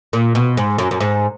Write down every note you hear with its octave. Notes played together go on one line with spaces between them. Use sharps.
A#2
B2
G#2
F#2
F#2
G#2